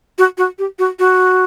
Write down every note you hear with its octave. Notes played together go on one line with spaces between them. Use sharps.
F#4
F#4
G4
F#4
F#4